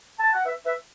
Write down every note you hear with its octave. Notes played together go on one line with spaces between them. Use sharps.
A5
F#5
B4 E5
B4 E5